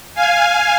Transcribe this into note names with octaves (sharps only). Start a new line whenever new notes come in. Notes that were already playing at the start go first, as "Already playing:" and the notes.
F5 G#5